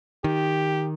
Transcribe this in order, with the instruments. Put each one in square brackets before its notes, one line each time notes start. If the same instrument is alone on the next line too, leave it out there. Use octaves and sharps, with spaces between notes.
[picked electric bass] D#3 [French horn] G4